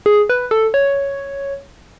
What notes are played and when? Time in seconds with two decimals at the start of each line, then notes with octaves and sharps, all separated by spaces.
0.06 G#4
0.29 B4
0.51 A4
0.74 C#5